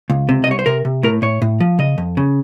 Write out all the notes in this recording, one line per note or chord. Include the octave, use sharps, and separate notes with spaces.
C#2
C3
D#5
C2 C#5
C5
C3 A#4
C3
A2 A#4
A2 C#5
A2
F3
C#3 D#5
F2
C#3